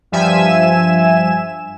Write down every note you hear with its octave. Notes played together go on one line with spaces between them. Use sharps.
G2 F3 E5 G#5 E7